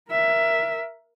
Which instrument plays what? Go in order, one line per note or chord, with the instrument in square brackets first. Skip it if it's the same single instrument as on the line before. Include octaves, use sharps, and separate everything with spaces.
[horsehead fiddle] A#4 E5